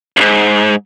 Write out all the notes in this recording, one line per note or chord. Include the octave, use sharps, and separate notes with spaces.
C2 G#2